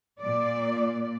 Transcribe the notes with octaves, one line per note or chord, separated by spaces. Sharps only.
A#2 D5